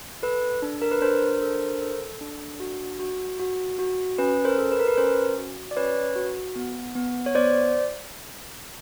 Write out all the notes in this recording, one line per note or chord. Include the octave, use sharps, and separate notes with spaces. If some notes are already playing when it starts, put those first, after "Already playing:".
A4 B4
D4
A#4
B4
D4 A#4 C5
A4
A4
D4
F#4
F#4
F#4
F#4
C#4 B4
A#4 C5
A4
B4
A#4
B4
C#4 A#4 C5
F#4
D5
C#4 B4 C#5
F#4
B3
B3
C#5
B3 C5 D5